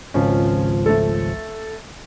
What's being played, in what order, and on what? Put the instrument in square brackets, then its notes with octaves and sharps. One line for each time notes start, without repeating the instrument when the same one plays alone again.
[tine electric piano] G#1 C#2 F3 [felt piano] C#4
[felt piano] A3 A4